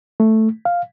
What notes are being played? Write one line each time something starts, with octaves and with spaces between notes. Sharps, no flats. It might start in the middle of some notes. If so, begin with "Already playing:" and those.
A3
F5